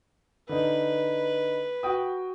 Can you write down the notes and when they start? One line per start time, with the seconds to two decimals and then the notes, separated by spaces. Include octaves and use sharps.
0.49 D3 D#4 B4
1.83 F#4 G5 D#6